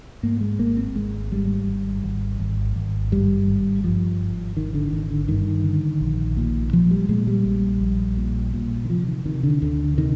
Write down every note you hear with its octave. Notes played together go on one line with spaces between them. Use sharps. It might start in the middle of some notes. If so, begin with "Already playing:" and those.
G#2 A#3
G#3
G#1 A#3
C4
G#1 G#3
G#2 G3
G#1
G#1
G#1
G#1
G2 G3
G#1
G2 F3
G#1
G#1 D#3
D3
G#1 D#3
D3
G2 D#3
D3
A#1
A#2
A#2 F3
G3
A#2 G#3
G3
A#1
A#1
A#2
A#2
D#3
C3 F3
D#3
C3 D#3
D3
D2 D3
C3 D#3